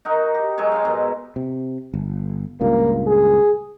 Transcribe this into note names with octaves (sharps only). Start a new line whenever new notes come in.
D#4 F#4 A#4
G4
F#3 G#3 C5 C#5
F5 G#5 C6
G#2 B2 F#3
C3
G1
C#2 G2 A#2 A#3
G#4